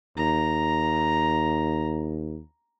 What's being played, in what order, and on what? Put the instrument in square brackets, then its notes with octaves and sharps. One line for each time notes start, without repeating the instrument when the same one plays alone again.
[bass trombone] D#2 [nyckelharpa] A#5